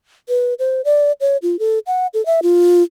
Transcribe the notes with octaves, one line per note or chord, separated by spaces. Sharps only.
B4
C5
D5
C#5
F4
A4
F#5
A4
E5
F4